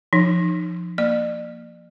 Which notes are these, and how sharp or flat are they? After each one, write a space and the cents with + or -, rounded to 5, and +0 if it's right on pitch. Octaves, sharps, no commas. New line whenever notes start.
F3 -5 D#4 -20
A#3 +0 D5 +40